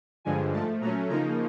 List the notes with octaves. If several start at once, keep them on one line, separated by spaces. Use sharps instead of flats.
G2 D3 F3 G#3 G#5
G#2 F3 A3 A5
A#2 F#3 A3 C#4 A#5
C#3 F3 A#3 D#4 A#5